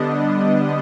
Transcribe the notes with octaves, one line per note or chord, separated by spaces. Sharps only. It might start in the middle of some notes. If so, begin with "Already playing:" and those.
Already playing: D3 G3 B3 D4 D#5